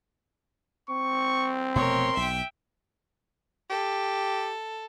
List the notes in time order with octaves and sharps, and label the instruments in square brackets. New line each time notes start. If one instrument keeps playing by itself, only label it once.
[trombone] C4 [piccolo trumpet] C#6
[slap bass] F1 B2 A3 [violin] A#4 C#5 [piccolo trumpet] C6
[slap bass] B1 [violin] E5 G5
[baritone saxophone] G4 [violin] A4